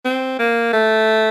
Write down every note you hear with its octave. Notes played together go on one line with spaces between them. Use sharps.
C4
A#3
A3